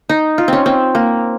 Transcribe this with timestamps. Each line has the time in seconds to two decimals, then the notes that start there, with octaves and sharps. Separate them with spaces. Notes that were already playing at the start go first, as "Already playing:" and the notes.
0.09 D#4
0.38 F4
0.48 C4 C#4
0.66 C4
0.95 A#3